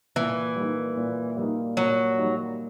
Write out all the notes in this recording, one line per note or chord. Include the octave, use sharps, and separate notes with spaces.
A#2 E3
G3 A#3 D#4
A#2
G3 A#3 D#4
A#2 F#3
G3 A#3 D#4